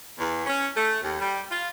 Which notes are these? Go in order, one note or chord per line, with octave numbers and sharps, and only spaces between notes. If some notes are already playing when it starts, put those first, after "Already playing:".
E2
C#4
A3
D#2
G3
F4